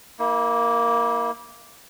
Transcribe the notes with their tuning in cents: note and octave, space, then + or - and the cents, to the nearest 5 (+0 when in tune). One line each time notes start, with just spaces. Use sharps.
A#3 +0 E4 -40